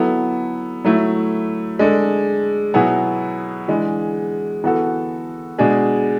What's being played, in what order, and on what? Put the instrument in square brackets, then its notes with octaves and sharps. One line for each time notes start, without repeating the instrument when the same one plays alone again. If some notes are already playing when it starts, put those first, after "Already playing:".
Already playing: [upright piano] F#3 B3 E4 A4
F#3 A3 E4
G#3 D4 A4
B2 F#3 B3 E4 G#4
E3 G#3 D4
E3 B3 F#4 A4
B2 G#3 D4 G#4